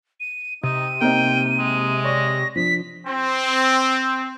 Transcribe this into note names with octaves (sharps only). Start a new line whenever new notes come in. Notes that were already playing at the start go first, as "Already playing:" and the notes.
D#7
C3 D#4 D#7
A#3 C4 D#4 G5
G#3
C#5 D5 C#6 A#6
F3 D4 B6
C4